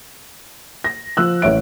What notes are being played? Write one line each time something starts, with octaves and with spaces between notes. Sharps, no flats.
A#6
F3 E6 F#6
A1 C#5 E5 D7